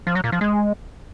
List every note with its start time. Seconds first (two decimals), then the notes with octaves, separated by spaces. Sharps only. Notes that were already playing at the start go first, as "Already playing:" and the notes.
0.07 F3
0.15 F#3
0.24 A#2
0.32 F3
0.41 G#3